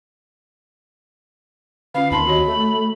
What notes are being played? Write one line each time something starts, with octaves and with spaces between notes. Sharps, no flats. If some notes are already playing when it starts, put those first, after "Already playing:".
D3 C#4 F4 F5
D#2 C4 A5 B5 C6
F#4 C#5 D#5
A3